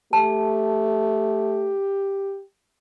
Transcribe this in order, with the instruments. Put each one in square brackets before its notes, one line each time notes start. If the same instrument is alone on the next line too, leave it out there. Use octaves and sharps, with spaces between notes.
[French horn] A3 [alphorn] G4 [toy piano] A5